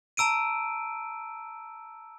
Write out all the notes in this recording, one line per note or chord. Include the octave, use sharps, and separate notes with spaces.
A5 A#5 E6 D7 D#7